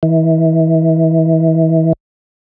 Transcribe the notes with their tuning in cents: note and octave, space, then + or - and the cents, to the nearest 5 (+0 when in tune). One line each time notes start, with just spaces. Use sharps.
E3 -30